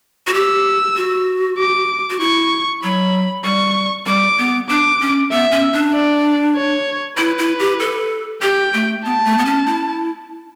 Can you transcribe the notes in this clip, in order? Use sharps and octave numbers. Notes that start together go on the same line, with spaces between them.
F#4
G4 E6
F#4
D6
F#4
E4 C#6
F#3 B5
G3 C#6
G3 D6
B3
D4 D6
C#4
B3 E5
C#4
D4
D5
C#5
E4 B4
E4
G4
A4
G4 G5
A3
B3 A5
A3
B3
C#4
E4